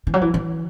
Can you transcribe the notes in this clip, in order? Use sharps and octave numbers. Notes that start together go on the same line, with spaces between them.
E3
F#3
E3
E3